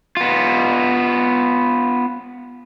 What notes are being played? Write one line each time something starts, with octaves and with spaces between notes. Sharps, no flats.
B3 F4